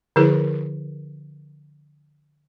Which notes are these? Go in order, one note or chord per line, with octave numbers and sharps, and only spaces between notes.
D3 F3 E4 G#4 A#4 B4